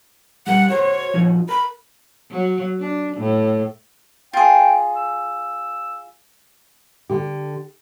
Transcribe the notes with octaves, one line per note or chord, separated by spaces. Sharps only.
G3 G4 A#4 F#5
F#4 A#4 C5 C#5
F3 D#4 F#4
A#4 B5
F#3
D4
A2
F4 G#4 G5
E6
D3 G4